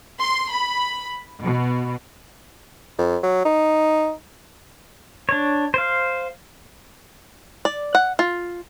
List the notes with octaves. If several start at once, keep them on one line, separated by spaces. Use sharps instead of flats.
C6
B5
B2
F2
F#3
D#4
D4 C#5
C5 F5
D5
F#5
F4